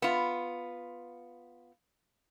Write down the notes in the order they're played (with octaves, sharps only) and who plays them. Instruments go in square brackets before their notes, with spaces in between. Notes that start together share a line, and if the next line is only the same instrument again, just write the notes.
[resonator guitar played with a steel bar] B3 F4